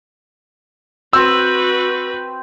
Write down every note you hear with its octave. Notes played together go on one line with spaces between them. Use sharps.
C4 F#4 B4 E6